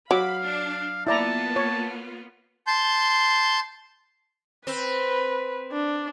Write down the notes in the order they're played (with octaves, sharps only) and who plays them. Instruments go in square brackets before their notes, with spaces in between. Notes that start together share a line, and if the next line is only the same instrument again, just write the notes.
[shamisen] F#3 [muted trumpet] F5 [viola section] B5 [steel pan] D6
[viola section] D4
[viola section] A#3 B3 F4 [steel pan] E4 D5 A#5 [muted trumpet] A5
[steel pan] C#5
[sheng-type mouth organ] A5 C6 G6
[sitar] C4 [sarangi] B4
[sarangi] D4